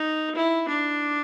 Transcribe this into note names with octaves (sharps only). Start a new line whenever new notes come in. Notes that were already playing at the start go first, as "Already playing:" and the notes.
Already playing: D#4
E4
D4